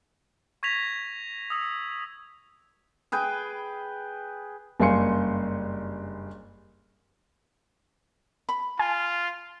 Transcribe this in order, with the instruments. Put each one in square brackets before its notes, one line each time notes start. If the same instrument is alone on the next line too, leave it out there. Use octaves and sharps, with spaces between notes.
[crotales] C#6 G#6 A#6 B6 F7
D#6 E6
[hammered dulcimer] G#4 B4 G5
[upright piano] F#1 G2 F5 G#5 C6 C#7
[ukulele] B5
[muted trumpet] F4 [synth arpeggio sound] G#5